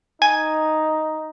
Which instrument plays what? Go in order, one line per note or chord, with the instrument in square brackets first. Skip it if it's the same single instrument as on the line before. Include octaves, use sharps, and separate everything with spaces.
[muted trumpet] D#4 [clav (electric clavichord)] G#5